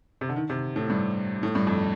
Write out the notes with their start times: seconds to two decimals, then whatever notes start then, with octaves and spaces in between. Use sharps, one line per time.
0.21 C3
0.29 D3
0.36 D#3
0.50 C3
0.76 A2
0.90 G2
1.43 A2
1.55 G2
1.67 F2